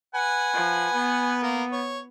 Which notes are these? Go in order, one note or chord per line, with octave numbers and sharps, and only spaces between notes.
B4 F#5 G#5
F3
B3
A#3
C#5